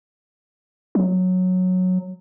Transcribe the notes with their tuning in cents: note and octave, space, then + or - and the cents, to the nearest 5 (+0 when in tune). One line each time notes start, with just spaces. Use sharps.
F#3 -10